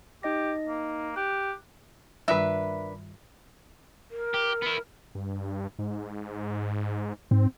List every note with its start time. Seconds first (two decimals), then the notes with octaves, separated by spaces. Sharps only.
0.23 D#4 G4 D#5 A#6
0.68 A#3
1.16 G4 F#6
2.28 G2 D#3 G3 D4 A#4 B4 E5
4.11 A#4
4.34 G4
4.63 B3 E4
5.15 G2
5.79 G#2
7.31 G#2 C4